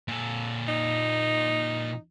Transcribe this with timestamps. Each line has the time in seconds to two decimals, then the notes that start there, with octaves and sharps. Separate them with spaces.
0.08 A#2 A4
0.68 D#4